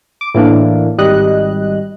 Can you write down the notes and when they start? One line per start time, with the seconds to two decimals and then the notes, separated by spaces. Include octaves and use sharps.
0.21 D6
0.35 A2 E3 A#3 D4
0.98 G#1 G3 D#5 F#6